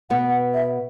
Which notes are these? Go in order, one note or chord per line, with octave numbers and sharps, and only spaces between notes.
B2 B3 F#5
F#5
E5